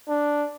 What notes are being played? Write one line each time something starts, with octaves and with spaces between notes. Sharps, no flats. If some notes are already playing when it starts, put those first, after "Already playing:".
D4